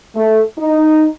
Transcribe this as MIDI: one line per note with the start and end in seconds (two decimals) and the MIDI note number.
0.15 0.42 57
0.58 1.06 63